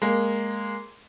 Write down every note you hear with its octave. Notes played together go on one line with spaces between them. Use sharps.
G#3 A#3